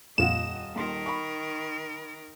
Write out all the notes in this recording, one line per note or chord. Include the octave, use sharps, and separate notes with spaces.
D#1 A#1 F2 F4 D#5 F#5 E7
D#1 D#3 A#4 C6
B5 C#6